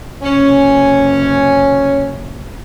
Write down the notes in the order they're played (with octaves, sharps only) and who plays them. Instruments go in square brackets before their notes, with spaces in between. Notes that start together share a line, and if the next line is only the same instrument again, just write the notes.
[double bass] F#1 C3 [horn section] C#4